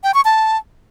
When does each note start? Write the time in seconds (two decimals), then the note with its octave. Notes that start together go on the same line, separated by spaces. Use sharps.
0.04 G5
0.14 C#6
0.25 A5